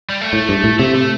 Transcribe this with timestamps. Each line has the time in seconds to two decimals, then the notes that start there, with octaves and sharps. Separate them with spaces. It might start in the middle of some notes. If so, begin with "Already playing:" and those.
0.10 G3
0.21 A3
0.33 A2
0.49 G2
0.64 A2
0.79 C3 A3
0.94 A3